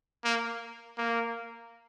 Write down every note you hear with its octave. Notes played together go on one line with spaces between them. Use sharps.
A#3
A#3